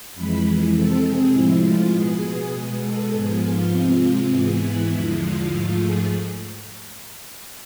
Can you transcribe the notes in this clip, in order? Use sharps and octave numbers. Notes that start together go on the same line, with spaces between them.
F2 E3 G#3 B5
C3 G#3 C4 A4
G#4
A2 F3 G#3 E4
F4
B2 B3 G#4
B2 G#3 B3
A4
G#2 F3 B3 G#4
F4
C3 G#3 C4
F4
G#2 E3 B3 G#4
E4
E2 D3 F3 G#3
F4
G#2 F3 A3 F4
G#4